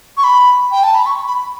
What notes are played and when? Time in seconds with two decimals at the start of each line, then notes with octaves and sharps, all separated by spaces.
0.17 C#6
0.24 B5
0.71 G5
0.83 A5
0.94 B5
1.06 C#6
1.27 B5